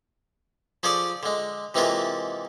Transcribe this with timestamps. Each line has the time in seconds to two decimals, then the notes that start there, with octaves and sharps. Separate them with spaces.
0.83 F3 C#4 G#4 A4 D5
1.23 D3 G#3
1.74 C3 E3 G#3 A#3 C#4 F4